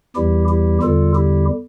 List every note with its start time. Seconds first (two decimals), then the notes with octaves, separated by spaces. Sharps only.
0.16 E2 E3 G3 E4 G4
0.49 E4 G4
0.82 E2 D3 G3 F4 A4
1.15 E4 G4